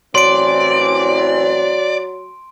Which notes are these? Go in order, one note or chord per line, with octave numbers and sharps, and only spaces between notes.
A1 E3 F#3 C4 D5 C6 D7